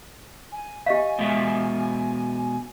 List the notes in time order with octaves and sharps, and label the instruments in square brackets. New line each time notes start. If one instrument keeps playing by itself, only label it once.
[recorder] G#5
[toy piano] G4 D#5 F5
[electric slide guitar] B2 G#3 E5